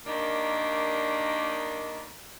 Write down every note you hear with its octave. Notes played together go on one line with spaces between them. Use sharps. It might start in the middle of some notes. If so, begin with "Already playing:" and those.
D#3 G3 A#3 D4 D#4